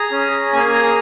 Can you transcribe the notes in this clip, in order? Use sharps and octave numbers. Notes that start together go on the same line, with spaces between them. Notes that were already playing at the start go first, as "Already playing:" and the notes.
Already playing: G#4 A#5
C#4
G#4
A#3 G#5
G#4 A#5